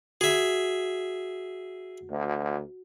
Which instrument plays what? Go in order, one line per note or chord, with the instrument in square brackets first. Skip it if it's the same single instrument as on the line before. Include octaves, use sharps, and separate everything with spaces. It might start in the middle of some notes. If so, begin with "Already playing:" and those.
[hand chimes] F#4 [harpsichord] G#4 E5
[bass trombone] D2